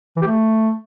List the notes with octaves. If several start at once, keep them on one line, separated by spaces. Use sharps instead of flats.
E3
G4
A3